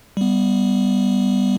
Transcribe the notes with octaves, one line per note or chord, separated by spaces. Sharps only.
G3 B3